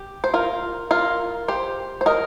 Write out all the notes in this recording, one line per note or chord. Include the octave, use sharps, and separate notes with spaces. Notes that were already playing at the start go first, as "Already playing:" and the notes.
Already playing: G4
C5
F4 A#4
F4 A#4
G4 C5
C5
A#4 D#5